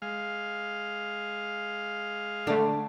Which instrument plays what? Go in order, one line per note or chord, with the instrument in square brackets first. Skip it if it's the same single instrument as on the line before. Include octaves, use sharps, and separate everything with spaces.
[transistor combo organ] G#3 F5
[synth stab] D3 A3 [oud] D4